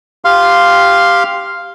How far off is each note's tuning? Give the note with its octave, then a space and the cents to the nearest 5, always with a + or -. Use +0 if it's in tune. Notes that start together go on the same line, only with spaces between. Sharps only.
G4 +0 F5 +0 C6 +0